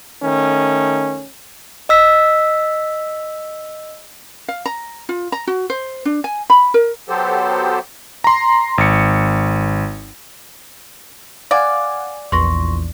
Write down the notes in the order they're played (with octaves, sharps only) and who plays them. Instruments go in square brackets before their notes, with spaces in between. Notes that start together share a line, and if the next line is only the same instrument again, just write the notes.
[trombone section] D#3 A3 C#4
[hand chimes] D#5 E6 B6
[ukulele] F5
A#5
F4
A#5
F#4
C5
D4
G#5
B5
A#4
[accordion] F#3 B3 G4 A4 C5
[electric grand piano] A#5 C6
G#1 C#7
[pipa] D5 [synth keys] F5 F#5 G#5
[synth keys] A#1 E2 [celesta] C6 C#6 A#6